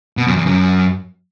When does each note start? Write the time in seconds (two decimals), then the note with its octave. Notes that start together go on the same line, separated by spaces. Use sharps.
0.17 B2
0.27 F#2
0.36 E2
0.46 F#2